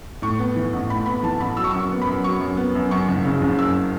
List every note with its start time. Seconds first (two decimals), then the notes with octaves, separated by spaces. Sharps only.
0.22 A2 C#6
0.39 B3
0.56 E3
0.73 A1
0.89 A2 B5
1.06 B3 B5
1.23 E3 A5
1.40 A1 B5
1.57 F#3 E6
1.64 C#6
1.71 E6
1.73 F#2
1.79 C#6
1.91 B3
2.02 B5
2.07 F#2
2.24 F#3 C#6
2.40 F#2
2.57 B3
2.75 F#2
2.91 F#2 C#6
3.08 F#1
3.24 C#3
3.42 F#1
3.59 F#2 E6